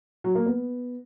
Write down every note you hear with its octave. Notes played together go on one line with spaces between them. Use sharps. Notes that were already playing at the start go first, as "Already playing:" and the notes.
F#3
A#3
B3